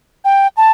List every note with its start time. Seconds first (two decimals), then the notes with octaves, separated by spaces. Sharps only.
0.25 G5
0.57 A5